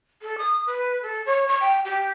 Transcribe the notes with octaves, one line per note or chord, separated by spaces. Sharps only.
A4
D#6
B4
A4
C#5
C#6
G5
G4